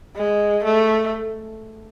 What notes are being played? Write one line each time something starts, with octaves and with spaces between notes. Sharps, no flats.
G#3
A3